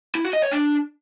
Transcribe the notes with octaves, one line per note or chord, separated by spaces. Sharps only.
E4
F#4
D#5
C#5
D4